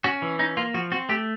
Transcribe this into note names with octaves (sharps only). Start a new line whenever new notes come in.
C#4 F#4
E3
C#4 D#4
A#3 F4
F3 F#4
C4 F#4
A3 G4